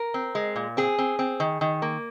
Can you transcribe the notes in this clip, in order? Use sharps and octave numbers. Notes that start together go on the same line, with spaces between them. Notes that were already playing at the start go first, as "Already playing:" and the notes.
Already playing: A#4
C4
G#3
A#2
C4 G#4
C4
C4
D#3
D#3
A#3